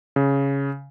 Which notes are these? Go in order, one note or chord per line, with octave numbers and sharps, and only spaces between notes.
C#3